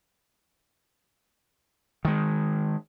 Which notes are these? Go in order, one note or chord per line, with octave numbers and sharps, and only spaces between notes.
D#3 G#3